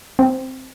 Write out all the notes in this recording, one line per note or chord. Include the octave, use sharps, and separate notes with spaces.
C4